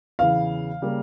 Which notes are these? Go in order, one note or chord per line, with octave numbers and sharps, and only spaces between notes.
E2 C#3 E3 F5
C#3 G3 A#3